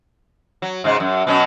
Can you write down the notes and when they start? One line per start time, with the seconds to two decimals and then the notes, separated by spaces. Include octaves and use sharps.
0.62 F#3
0.84 G#2 C#3 G#3
1.00 F#2
1.27 B2 F#3 C#4